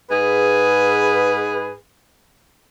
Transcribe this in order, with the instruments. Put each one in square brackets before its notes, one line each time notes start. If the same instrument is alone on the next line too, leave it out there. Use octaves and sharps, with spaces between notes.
[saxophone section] G#2 G#4 B4